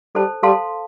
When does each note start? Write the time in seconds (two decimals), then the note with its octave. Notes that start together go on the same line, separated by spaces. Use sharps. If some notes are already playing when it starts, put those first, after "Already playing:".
0.15 G3 A4 C5 A5
0.43 G3 A4 F5 A5 C6